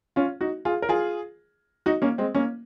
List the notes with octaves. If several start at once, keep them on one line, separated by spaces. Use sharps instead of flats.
C#4 F4
D#4 F#4
F4 G#4
A#4
F4 G#4
D#4 F#4
A#3 C#4
G#3 C4
A#3 C#4